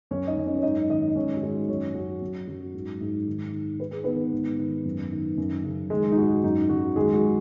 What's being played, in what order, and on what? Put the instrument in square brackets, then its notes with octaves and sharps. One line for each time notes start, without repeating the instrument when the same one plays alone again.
[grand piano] F#2 C#4 C#5
D#4 D#5
F#2
C#4 C#5
C#5
G#2 D#4 D#5
D#3 D#4 D#5
G#2 C#4 C#5
F#4
D#3 G#3 G#4
F#2 C#4 C#5
F#2 F#4
F#2
F#2 F#4
G#2
G#2
D#3
D#3
D#3 B4
G#4
D#3 B3 B4
G#2
D#3
F#2
D#3
F#2
C#3
D#3 G#3 G#4
D#4
G#2 F#4
F#2 D#4
F#2 F#4
D#3 G#3 G#4
F#4